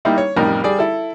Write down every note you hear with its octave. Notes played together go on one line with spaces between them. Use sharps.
G3 A#3 D#4 E4
C#5
A1 F2 G3 D#4 G4 A#4
G3 G4 G#4 D5
E4 A4